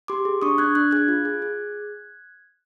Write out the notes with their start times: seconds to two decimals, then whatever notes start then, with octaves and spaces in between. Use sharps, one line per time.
0.08 G4 C6 D6
0.25 G#4
0.42 D4 C#6 D#6
0.58 D4 F#6 G#6
0.75 D4 F#6 G#6
0.91 G#4 F#6 G#6
1.08 F4
1.25 G#4
1.42 G#4